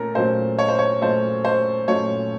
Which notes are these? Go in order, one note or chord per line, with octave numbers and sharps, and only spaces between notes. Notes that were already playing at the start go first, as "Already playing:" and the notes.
Already playing: A#2 A3 C#4 A#4
A#2 F#3 A3 C#4 C5
C#5
C5
C#5
A#2 F#3 A3 C#4 C5
C5
A#2 F#3 A3 C#4 C#5